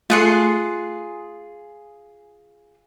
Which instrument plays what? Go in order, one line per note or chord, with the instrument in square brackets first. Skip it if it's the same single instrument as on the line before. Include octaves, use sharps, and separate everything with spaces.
[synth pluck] A3 F#6 C#7 [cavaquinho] F4 G#4 C6